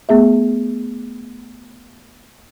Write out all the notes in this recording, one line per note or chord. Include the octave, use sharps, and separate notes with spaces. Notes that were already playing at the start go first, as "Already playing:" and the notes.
A3 B3 G#4 E5